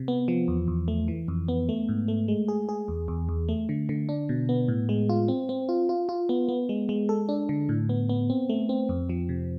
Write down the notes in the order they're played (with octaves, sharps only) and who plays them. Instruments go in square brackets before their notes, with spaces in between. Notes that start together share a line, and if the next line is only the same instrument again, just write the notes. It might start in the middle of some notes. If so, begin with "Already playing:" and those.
Already playing: [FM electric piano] C3
B3
F3
E2
E2
A3
E3
F2
B3
A3
G#2
A3
G#3
G#4
G#4
E2
E2
E2
A3
D3
D3
D4
B2
B3
A2
G#3
F4
C4
C4
F4
F4
F4
B3
B3
G#3
G#3
A4
D4
D3
A2
B3
B3
C4
A3
C4
F2
F3
C3